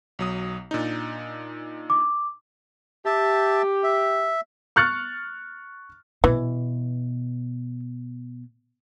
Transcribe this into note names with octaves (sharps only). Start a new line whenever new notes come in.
B1 F#3 D#6
A#2 D4 D#4
D6
G4 E5 A5
E5
C#6 F6 F#6 A6 C#7
B2 E3